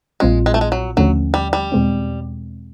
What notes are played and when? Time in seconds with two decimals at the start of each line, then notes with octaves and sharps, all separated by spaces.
0.20 A#1 A#2 G3 G#3 C4 F4
0.46 G#3
0.54 A3
0.61 G#3
0.72 F#3
0.97 D#2 D3 F3 F#3 A3 C#4
1.34 G3
1.53 G3
1.72 E2 B2 G#3 C4